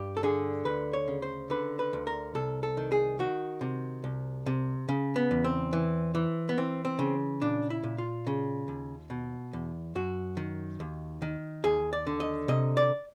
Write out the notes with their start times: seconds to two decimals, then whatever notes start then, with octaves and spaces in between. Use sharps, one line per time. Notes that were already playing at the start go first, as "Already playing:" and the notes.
Already playing: G2 G4
0.17 A4
0.23 D3 G#4
0.65 D2 B4
0.93 C#5
1.08 C#3
1.22 C5
1.50 D3 B4
1.79 B4
1.93 D2
2.07 A#4
2.35 C2 A4
2.63 A4
2.77 D#3
2.92 G#4
3.19 D#3 F#4
3.61 C3
4.04 C2
4.46 C3
4.89 C#3
5.16 B3
5.31 E2
5.44 C4
5.73 E3
6.15 E3
6.49 B3
6.58 E3 C4
6.85 C4
6.99 C#3
7.42 A#2 D4
7.70 E4
7.83 A#2
7.98 F4
8.27 C#3
8.68 D#2
9.10 B2
9.53 E2
9.95 F#2 F#4
10.37 D#3
10.80 D#2
11.22 D#3
11.64 D#2 G#4
11.93 D5
12.07 D3
12.20 D#5
12.48 C3 D#5
12.77 D5